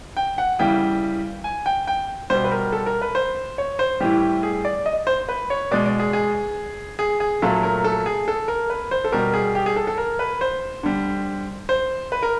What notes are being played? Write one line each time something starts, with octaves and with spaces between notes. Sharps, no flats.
G5
F#5
C#3 E3 G3 G5
G#5
G5
G5
B2 G3 C5
B4
A#4
A4
A#4
B4
C5
C#5
C5
A2 E3 G3 G4
G#4
D5
D#5
C5
B4
C#5
B2 G#3 D5
D5
G#4
G#4
G#4
G#4
A#2 F#3 A3 A4
A#4
A4
G#4
A4
A#4
B4
C5
A4
B2 G3 A#4
G#4
G4
G#4
A4
A4
A#4
B4
C5
D3 G3
C5
B4
A#4